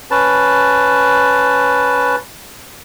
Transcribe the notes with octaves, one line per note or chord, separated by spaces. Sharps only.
C#4 B4 A5